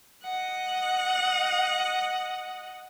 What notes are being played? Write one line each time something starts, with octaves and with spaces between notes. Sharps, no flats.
D#5 F#5